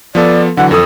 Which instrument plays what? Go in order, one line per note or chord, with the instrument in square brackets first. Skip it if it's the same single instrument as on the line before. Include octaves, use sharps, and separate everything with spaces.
[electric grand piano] F3 B3 A4 [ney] D5
[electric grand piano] D3 E3 F#3 [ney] F#5
[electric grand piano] F2 D#6 [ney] A4